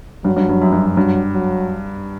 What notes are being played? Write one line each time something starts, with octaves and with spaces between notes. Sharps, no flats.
G2 F#3
G2
G2
F#2
G2
F#2
G2 F#3
F#3